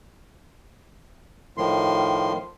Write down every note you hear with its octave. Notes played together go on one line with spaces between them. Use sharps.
A2 D#3 F3 C6